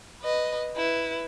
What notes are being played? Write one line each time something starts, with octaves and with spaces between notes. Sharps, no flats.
B4 D#5
E4 B4